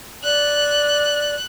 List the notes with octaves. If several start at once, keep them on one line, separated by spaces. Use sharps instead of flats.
D5 F#6